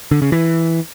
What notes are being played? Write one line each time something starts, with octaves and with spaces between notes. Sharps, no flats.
D3
C#3
E3